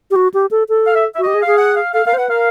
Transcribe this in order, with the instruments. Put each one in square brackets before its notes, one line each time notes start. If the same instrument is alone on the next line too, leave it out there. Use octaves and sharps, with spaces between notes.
[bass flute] G4
F#4
G4
A4
A4
[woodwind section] F5
E5
[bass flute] F#4 [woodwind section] E5
[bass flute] G4 [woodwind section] D#5
[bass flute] G#4
[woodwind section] F5
[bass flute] G#4
[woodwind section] F#5
F5
[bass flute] A4 [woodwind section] F5
[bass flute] A#4 [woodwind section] F5
[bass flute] C5
[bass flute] B4 [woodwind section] F#5
[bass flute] A#4 [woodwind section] F5